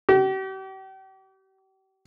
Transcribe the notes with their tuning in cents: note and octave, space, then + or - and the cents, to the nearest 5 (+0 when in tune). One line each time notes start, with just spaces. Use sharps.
G4 -40